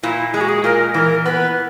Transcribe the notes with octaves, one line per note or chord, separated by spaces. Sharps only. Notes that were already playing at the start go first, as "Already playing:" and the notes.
A#2 E4
G#3 G#4
F#4
G#4
A#2 A#4
E3 A#4
B3 B4